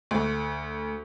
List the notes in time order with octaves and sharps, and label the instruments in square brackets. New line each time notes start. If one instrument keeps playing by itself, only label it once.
[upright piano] D2